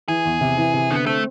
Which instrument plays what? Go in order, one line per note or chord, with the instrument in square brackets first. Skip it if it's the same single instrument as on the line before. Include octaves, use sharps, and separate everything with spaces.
[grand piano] E3 [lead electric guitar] G#4
[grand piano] E2
C3
E3
C3
[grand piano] D3 [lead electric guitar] B3
[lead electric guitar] A3 [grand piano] C4